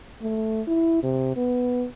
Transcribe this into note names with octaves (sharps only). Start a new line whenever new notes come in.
A3
E4
C3
B3